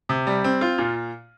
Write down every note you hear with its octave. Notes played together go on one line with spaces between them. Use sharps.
C3
G3
C4
F4
A#2